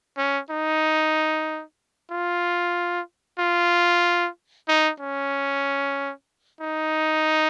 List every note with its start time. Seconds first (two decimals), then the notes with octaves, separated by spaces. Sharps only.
0.17 C#4
0.50 D#4
2.11 F4
3.39 F4
4.68 D#4
5.00 C#4
6.61 D#4